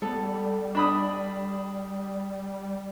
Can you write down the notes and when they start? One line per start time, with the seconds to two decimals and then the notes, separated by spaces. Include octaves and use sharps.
0.02 G3 B3 A4
0.75 D4 B5 D#6